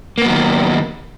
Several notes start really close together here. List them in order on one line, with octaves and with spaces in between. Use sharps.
A#3 B3 F#3 D#3